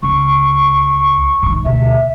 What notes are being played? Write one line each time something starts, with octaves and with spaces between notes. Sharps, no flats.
C#2 C#6
G#2 D#3
D2 B2 E5